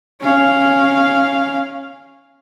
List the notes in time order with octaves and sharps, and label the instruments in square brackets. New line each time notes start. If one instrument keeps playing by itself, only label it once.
[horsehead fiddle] C#4 F5